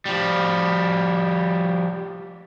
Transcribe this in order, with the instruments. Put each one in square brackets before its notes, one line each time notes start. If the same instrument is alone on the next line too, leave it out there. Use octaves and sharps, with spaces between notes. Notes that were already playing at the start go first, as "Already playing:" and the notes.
[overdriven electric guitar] F3 G3